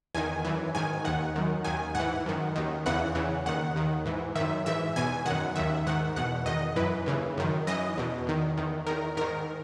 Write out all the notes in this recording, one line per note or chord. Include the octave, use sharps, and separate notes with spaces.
E2 D#3 G#5
F#2 E3
G#2 D#3 G#5
D#2 D#3 F#5
F#2 D#3
D#2 D#3 G#5
G#2 E3 F#5
F#2 D#3
D#2 D#3
E2 C#3 E3 F#5
E2 C#3 E3
D#2 D#3 F#5
D#2 D#3
G#2 E3
F#2 D#3 E5
G#2 E3 E5
E2 B2 G#5
F#2 D#3 F#5
D#2 D#3 E5
G#2 D#3 F#5
E2 B2 F#5
E2 D#3 D#5
F#2 E3 B4
D#2 C#3 E3
F#2 D#3
F#2 E3 D#5
E2 B2
E2 D#3
E2 D#3
E2 D#3 A#4
G#2 D#3 A#4